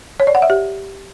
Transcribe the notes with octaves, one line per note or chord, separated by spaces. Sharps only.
C#5
D5
F#5
E5
G4